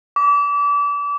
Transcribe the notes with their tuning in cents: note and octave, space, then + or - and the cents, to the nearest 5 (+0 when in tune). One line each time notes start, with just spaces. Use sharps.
D6 -30